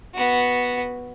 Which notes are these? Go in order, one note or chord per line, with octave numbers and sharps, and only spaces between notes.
B3 F#4